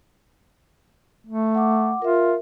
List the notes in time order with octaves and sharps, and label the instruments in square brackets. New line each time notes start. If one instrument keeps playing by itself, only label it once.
[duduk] A3
[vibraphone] F#5 D6
[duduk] F4 [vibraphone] A#4 E5